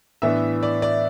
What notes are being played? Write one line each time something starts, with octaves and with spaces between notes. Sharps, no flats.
A2 E3 B3 D4 E5
D5
D5